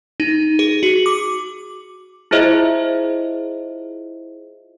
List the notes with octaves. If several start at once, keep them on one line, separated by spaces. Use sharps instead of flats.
D#4
G#4
F#4
D6
E4 F4 G#4 C5 D#5 E5